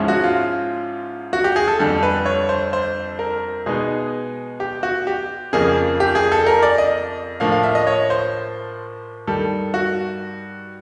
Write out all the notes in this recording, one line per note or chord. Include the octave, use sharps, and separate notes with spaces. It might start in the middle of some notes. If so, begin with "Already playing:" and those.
Already playing: G#2 F3 G#3 C#4 E4
F#4
F4
F#4
G4
G#4
A4
F2 D3 G3 A4
B4
C#5
C5
C5
A#4
B2 G#3 B3 D#4 G#4
G4
F#4
G4
F2 C#3 F3 A#3 G#4
G4
G#4
A4
A#4
D5
D#5
A2 F3 A#3 D4 F5
F5
E5
D#5
C#5
C5
G2 D#3 G3 A4
F#4